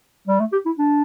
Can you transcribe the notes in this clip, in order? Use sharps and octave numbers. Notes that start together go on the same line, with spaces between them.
G3
A3
G4
E4
D4